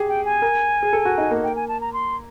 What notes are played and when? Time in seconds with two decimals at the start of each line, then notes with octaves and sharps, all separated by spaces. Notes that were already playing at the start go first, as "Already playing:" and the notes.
Already playing: G4 G#4
0.08 G5
0.25 G#5
0.42 A#4
0.83 G#4
0.93 A4
1.05 F#4
1.18 D#4
1.31 A#3
1.44 G5
1.56 G#5
1.68 A5
1.81 A#5
1.93 C6